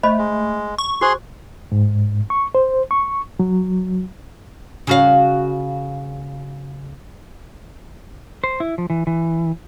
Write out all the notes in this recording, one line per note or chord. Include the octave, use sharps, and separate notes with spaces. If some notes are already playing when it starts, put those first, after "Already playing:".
A3 C5 D#5 B5
G#3
C#6
F#4 G#4 C5 C6
G#2
C#6
C5
C#6
F#3
C#3 F#4 F5
C5
E4
F3
E3
E3